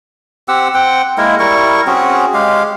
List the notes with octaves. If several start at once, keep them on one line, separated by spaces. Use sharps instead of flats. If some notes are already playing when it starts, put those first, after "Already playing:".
C4 G4 F#5 E6
C4 F#5 G5
G#3 A#3 E4 A#4
G3 E4 A#4 C#6
C4 C#4 F#4 G#4
G#3 G4 F5